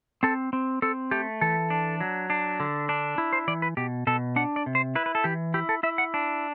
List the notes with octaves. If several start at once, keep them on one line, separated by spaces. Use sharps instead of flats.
C4 A4
C4
C4 A4
A3 G4
E3 A4
D4
F#3
D4
D3
D4
E4
C5
E3 D5
B4
B2 G4
B2 A4
D4 F#5
D5
C3
C5
E4 B4
B4
A4
E3 G4
E4 G4
A4
E4 E5
F#5
D4